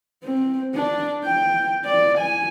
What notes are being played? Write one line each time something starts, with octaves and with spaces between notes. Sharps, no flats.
C4
D4
G5
D5
G#5